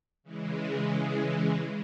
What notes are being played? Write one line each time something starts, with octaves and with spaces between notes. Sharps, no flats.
C#3 E3 G#3